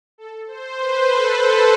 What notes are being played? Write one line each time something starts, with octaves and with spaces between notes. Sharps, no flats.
A4
C5
B4
A4
B4